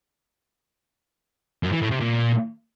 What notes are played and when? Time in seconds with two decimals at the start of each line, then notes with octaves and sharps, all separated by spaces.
1.63 F#2
1.72 E3
1.82 A2
1.91 C3
2.01 A#2